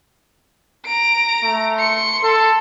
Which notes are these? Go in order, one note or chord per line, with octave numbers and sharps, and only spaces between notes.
A#5 D7
A3
C6 C#7
A4